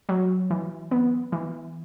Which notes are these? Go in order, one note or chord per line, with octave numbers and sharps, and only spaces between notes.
F#3
E3
B3
E3